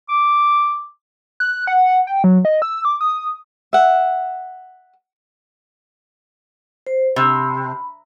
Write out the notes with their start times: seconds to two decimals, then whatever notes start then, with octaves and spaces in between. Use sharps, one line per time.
0.09 D6
1.40 F#6
1.67 F#5
2.07 G5
2.24 F#3
2.45 D#5
2.62 E6
2.85 D6
3.01 D#6
3.73 E5 F#5
6.87 C5
7.16 C3 B5